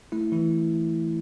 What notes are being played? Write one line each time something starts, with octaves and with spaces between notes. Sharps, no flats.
A3 E4
E3 E4